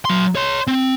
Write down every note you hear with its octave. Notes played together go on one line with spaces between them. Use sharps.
F#3 C6
C#5 C6
C4